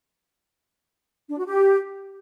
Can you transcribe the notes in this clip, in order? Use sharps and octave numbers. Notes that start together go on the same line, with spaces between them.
D4
F#4
G4